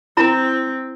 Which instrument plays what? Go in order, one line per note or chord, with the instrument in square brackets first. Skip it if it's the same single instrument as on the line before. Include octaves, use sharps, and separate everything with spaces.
[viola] C4 [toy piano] E4 A#5